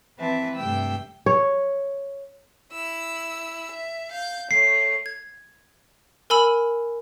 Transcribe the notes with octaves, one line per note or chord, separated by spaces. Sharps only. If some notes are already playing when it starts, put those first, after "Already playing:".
E3 C4 B4 E5 A5
G2 C3 A3 G5 E6
C#5
E4 E6
E5
F5 G6
A3 C#5 C7
G#6
A#4 G#5 B5 E6 F#7